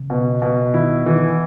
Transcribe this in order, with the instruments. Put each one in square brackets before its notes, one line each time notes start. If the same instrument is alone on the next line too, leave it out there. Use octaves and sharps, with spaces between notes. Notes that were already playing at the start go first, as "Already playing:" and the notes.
Already playing: [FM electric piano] C#3
[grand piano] B2
B2
[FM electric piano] D#3 [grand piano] E4
[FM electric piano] D#3 [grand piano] E3